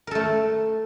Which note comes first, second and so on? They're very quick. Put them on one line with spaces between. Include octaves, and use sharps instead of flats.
A#4 A4 A3